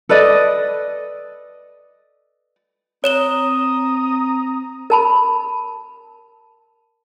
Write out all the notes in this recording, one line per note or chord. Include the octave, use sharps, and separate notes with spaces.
A4 B4 D5 D#5
C4 C#5 A#5 D#6 E7 G7
A#4 A5 B5